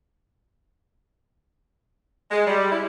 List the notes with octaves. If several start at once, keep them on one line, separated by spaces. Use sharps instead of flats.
G#3
G3
E4